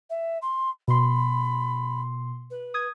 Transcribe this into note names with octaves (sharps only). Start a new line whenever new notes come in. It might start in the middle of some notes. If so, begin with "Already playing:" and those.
E5
C6
B2 B5 C6
B4
D#6 G#6